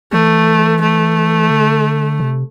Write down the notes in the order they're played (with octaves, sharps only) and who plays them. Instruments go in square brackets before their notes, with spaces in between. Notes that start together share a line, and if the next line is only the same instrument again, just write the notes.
[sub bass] E3 [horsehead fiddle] A3
[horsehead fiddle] A3
[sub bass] D3
C3